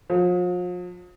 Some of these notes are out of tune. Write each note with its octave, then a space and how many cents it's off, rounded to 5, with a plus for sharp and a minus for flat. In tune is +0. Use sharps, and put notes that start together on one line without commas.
F3 +40